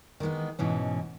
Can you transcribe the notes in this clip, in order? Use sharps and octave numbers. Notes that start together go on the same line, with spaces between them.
D#3 E3 G#3 B3
G#2 B2 E3 C#4